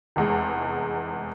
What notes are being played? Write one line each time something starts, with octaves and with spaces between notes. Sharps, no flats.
F1 E2 G#3